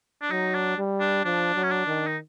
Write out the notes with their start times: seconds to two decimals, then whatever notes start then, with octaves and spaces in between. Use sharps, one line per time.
0.22 D4
0.30 F#3 D#4
0.55 D4
0.78 G3
1.01 D4
1.25 F3 D4
1.55 F#3
1.63 C#4
1.71 D4
1.87 D#3
2.07 D#4